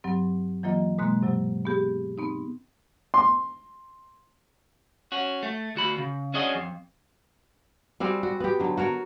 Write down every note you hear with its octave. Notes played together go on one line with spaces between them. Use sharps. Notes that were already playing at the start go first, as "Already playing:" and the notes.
G2 F#3 C4
E3 F#3 A#3 F4 D#5
B2 G#3 A#3 C6 F#6
G2 C3 F#3
B3 G4 G#4
B3 C4 D#4
C6
C#4 F#4
A3
D2 F#4 B5
C#3
C#4 D4 F#4 G#4 D#5
F2
G3 C4 F#4 G#4
F#4
B3 G4
D3 F#3
F#4 A#4 C#5